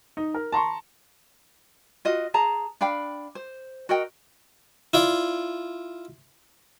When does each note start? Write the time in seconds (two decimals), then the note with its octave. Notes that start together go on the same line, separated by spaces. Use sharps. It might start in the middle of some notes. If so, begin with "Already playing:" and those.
0.17 D#4
0.34 A#4
0.52 A5 A#5 C6 C#6
2.05 F4 F#4 D#5
2.34 G#4 A5 A#5
2.81 D4 F5 G5 B5
3.35 C5
3.89 F#4 A#4 D#5 G5
4.94 E4 F4 D5